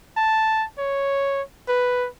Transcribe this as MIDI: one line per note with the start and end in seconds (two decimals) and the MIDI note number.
0.17 0.65 81
0.78 1.42 73
1.68 2.09 71